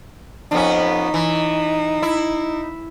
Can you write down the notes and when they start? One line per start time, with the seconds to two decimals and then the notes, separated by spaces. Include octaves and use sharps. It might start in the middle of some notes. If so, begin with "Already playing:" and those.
0.52 F2 B3 C#4 D#4
1.14 E3
2.02 E4